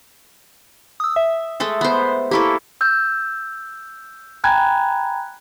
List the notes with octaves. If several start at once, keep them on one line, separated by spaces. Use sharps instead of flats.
D#6 E6
E5
G#3 A3 A4
B3 C5
A#3 E4 G4 A4 C#6
E6 G6
G5 G#5 A#5 B5 F#6 G#6